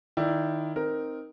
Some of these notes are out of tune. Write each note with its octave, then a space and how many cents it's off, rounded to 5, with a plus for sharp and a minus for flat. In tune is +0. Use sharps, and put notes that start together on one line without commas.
D#3 +0 E4 +20 D5 +0
C4 +0 D#4 +0 A#4 +5